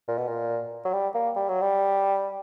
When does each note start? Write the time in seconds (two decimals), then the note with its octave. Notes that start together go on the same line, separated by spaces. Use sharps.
0.08 A#2
0.18 B2
0.27 A#2
0.85 F#3
0.93 G3
1.14 A#3
1.35 G3
1.48 F#3
1.61 G3